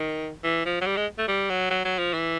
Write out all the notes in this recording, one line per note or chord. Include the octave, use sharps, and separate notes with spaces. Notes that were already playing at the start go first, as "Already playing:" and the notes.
Already playing: D#3
E3
F3
F#3
G3
G#3
A3
G3
F#3
F#3
F#3
F3
E3